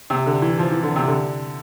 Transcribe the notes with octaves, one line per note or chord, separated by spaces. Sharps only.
C3
D3
E3
F3
E3
D3
C3
D3